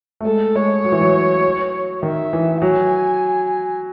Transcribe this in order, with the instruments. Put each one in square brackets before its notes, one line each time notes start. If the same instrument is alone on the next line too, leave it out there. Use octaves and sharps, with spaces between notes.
[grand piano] A3
[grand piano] G#3 [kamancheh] A4
[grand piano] G#3 [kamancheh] C#5
[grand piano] F#3
E3
F#3
[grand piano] D#3 [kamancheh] E5
[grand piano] E3
[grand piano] F#3 [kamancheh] G#5